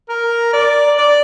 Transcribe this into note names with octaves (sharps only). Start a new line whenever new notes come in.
A#4
D5
D5